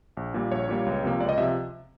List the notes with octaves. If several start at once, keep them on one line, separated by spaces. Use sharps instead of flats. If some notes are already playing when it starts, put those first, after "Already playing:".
A#1
A#2 G3 A#3
A#1 C#5
A#2 G3 A#3
C#2
C3 F3 A#3
C#2 D5
D#5
C3 F3 E5